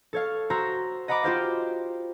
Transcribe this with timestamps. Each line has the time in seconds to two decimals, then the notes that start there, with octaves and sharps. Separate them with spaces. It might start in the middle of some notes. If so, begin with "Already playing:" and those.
0.13 A4 C#5 F5
0.50 F#4 C5 A#5 C6 E6
1.08 D#5 F#5 A#5 B5 D6
1.23 F4 G4 C5 F5